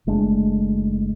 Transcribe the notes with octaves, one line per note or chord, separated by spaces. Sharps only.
F#1 G#3 A3 D4